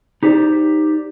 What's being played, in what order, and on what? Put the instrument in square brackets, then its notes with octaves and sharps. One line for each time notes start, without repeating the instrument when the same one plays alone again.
[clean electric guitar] D#4 G4 C5 D5